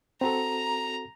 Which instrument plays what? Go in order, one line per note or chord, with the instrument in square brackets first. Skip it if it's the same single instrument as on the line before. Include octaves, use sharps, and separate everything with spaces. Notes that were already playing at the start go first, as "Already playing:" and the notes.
[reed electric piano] C4 F#4 A4 [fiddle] A#5